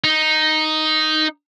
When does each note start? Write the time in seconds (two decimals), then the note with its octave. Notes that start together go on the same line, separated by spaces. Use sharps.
0.04 D#4